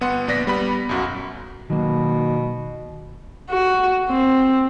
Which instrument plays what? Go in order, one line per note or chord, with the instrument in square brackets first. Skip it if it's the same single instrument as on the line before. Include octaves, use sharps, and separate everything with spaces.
[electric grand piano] G1 B3 F#5 C6
A#1 B3 D5 A#6 B6
G3 B3 B5
B1 F#2 F#4
[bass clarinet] B2 [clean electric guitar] D#3 F#3 A#3
[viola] F#4
C4